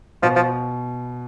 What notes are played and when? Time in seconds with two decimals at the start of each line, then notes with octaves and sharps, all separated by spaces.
0.23 B2 F3
0.36 F3